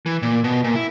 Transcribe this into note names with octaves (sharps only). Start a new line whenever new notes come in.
E3
A#2
B2
A#2
E4